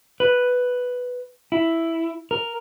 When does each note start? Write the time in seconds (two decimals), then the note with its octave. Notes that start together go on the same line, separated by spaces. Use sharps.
0.20 B4
1.52 E4
2.31 A#4